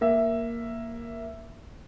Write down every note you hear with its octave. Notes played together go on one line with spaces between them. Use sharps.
A#3 E5